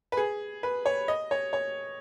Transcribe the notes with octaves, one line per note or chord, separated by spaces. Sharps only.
B4
G#4
B4
C#5
D#5
C#5
C#5